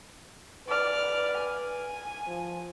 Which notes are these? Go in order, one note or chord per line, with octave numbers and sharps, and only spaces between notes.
B4 D5 F6
G#5
F3